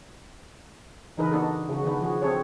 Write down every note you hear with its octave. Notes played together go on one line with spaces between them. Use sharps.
C#3 E3 D#4 A#4 B4
B3 D4 D#4 F#4 A4
C#3 F#4
D#3 B3 D4 B4
F3 F#4 G#4
C4 D4 F#4 G#4 A4 C#5